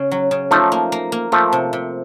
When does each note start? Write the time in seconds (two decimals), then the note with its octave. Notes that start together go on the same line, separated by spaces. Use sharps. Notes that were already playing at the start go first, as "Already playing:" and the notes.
Already playing: C#3
0.11 F#3
0.31 C#3
0.51 F3 A3 D#4
0.72 A#3
0.92 A#3
1.12 A#3
1.32 F3 A3 A#3
1.53 C3
1.73 C3